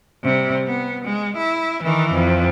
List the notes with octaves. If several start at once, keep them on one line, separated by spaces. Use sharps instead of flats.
C3 G3
B3
G#3
E4
D#3 E3
F2